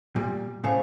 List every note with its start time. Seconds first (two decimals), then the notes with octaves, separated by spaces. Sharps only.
0.16 A#2 G3
0.64 A2 C#3 A3 C5 F5 G#5